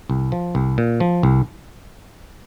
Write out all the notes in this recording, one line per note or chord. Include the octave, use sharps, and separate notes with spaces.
C2
F3
C2
A#2
F3
C2